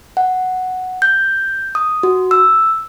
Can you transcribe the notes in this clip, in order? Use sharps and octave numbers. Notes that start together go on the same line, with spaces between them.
F#5
G6
D#6
F#4
E6